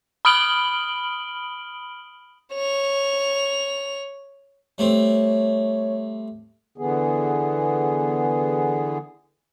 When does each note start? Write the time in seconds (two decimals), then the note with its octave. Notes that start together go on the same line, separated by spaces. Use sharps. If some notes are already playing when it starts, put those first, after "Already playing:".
0.25 B5 D#6 F6 D7 F#7 G7
2.54 C#5 F7
4.78 G3 A3 C4 C#5
6.78 D3 E3 B3 G#4